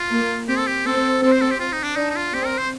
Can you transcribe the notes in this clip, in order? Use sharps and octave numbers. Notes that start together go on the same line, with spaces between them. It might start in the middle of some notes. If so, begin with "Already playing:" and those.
Already playing: F4
A#3
C4 G4
A4
G4
C4 A4
C4 A4
C5
A4
G4
F4
D#4
D4
D4 D#4
D#4
F4
C4 G4
A#4
C5